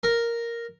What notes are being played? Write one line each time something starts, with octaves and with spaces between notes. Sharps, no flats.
A#4